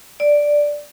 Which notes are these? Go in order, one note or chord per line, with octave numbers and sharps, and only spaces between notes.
D5